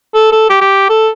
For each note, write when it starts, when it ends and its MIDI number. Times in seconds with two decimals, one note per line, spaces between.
0.15 0.31 69
0.32 0.46 69
0.50 0.59 67
0.61 0.89 67
0.90 1.09 69